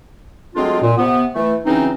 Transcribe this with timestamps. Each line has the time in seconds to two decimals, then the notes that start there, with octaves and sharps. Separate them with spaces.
0.56 F#3 G#3 A3 C4 D4 F4
0.82 A#2
0.98 C3 B3
1.34 E3 A3
1.66 C#3 E3 F#3 C4 C#4 D#4